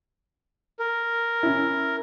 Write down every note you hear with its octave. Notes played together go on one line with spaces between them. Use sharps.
A#4
C#4 E4